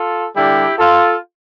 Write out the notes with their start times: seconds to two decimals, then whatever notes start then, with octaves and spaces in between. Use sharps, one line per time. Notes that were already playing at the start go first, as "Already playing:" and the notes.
Already playing: F4 A4
0.36 D3 G3 D4 E4 G4
0.79 F4 A4